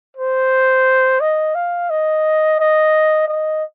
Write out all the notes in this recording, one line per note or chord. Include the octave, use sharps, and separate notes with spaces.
C5
D#5
F5
D#5
D#5
D#5